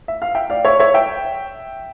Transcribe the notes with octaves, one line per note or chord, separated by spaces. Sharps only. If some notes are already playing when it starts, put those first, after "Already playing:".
E5
F5
E5 G5
D5 F5
C#5 E5
C#5 E5
E5 G5